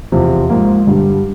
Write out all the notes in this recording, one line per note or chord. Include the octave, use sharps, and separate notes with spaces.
E2 C3 F3
G#2 F3 A#3
G2 D3 G3